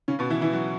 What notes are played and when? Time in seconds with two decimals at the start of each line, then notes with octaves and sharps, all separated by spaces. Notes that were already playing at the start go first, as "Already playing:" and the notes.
0.08 C#3 C#4
0.19 B2 B3
0.30 E3 E4
0.41 E3 E4
0.53 F#3 F#4